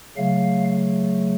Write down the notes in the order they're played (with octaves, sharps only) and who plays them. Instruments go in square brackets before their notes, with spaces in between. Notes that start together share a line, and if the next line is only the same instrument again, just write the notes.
[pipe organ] C#3 F#3 A3 F5